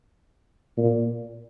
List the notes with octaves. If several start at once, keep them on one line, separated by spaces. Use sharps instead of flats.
A#2